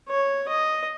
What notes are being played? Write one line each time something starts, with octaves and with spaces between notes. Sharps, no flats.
C#5
D#5